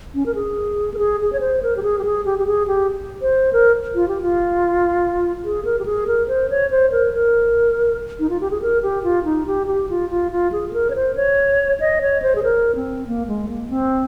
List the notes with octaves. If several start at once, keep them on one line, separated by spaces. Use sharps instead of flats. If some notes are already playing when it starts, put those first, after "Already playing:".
C#4
A#4
G#4
A#4
G#4
G#4
C#5
C5
A#4
G4
G#4
G4
G#4
G4
G4
G#4
G4
C5
A#4
F4
G4
F4
G#4
A#4
G4
G#4
A#4
C5
C#5
C5
A#4
A#4
D#4
F4
G4
G#4
A#4
G4
F4
D#4
G4
G4
F4
F4
F4
G#4
G#4
A#4
C#5
C5
C#5
D#5
C#5
C5
G#4
A#4
C4
A#3
G#3
A#3
C4